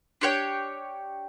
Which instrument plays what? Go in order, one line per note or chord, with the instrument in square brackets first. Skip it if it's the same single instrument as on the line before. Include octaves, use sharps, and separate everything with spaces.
[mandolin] D4 G4 C#5 G5